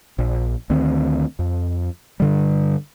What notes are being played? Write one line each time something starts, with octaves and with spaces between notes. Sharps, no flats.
A#1
D2 D#3 C4
F2
G2 D3 G3